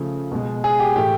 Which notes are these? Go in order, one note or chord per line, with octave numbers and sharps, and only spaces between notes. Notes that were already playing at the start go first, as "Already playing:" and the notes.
Already playing: C#3 F3 A3
B2 G#3
G#4
G4
A2 E3 A3 G4